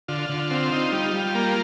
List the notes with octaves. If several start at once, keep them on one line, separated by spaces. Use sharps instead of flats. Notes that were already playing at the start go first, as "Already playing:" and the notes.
D3 F4
D3
C4
D#4
G3
G3
A#3